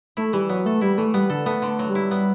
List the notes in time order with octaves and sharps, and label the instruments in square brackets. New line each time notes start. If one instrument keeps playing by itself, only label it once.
[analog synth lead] A3 [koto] E4
[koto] E3 [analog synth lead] G3
[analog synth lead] F#3 [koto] B3
[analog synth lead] A3 [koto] A4
[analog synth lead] G3 [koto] E4
[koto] E3 [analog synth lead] A3
[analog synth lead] G3 [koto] B3
[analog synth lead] D3 [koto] A4
[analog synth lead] A3 [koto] B3
[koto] D3
[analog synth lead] A3
[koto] F#3
[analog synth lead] G3
[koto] E4
B3